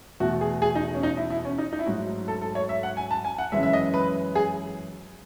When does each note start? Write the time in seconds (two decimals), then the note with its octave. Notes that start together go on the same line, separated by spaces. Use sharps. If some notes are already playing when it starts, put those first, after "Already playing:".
0.20 E2 B2 A3 F#4
0.41 G#4
0.62 G#4
0.75 D#4
0.95 C#4
1.03 D#4
1.17 E4
1.30 E4
1.45 C#4
1.58 D#4
1.73 D#4
1.79 E4
1.86 G#2 F#3 A3 F#4
2.28 A4
2.41 A4
2.55 C#5
2.69 E5
2.83 F#5
2.97 G#5
3.11 A5
3.25 G#5
3.38 F#5
3.52 F#2 C#3 E3 G#3 E5
3.63 E5
3.73 D#5
3.94 B4
4.35 G#4